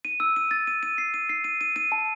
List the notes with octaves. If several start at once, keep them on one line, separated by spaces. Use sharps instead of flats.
D#7
E6
D#7
A6
D#7
D#7
C7
D#7
C7
D#7
D#7
D#7
A5